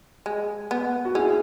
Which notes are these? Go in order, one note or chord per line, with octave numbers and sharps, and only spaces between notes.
G#3
B3
F#4
C#4 E4 G#4